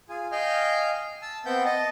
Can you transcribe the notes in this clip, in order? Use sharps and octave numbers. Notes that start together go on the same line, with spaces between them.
F4 G#4 G#5
D#5 F5 G5 G#5 F6 G6
A5 E6
B3 C4 E5 F#5 G5 G6
D#5 A5